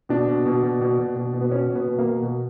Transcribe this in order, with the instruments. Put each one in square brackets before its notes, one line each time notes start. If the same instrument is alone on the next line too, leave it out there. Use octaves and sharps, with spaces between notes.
[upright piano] B2 D4
B2
B2
B2
B2
B2
B2
B2
B3
B2 C#4
B2
B3
B2
A#3
B2
B2